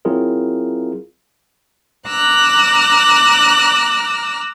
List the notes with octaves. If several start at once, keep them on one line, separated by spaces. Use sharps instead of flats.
F#3 C4 E4 F4 G#4 A#4
A#5 D6 E6 F#6